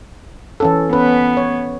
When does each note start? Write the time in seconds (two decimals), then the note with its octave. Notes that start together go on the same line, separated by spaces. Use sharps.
0.60 E3 C#4 A4
0.93 B3 C#4 B4
1.37 C#5